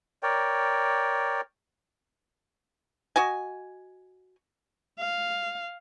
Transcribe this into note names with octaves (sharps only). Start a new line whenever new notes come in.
A#4 C#5 D5 G5
F#4 D#5 G#5
F5